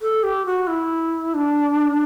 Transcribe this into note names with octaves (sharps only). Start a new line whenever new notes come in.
A4
G4
F#4
E4
D4